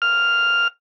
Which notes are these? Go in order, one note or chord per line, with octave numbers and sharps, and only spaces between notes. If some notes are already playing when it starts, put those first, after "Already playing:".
F6